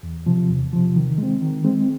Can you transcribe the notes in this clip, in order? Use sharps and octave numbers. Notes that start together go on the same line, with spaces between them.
E2
C3 F3
E2
C3 F3
D#3
G#3 C4
D#3
G#3 C4